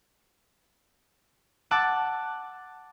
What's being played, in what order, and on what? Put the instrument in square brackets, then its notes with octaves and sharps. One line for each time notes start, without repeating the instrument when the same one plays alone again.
[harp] F#5 A5 D6 E6 F#6 A6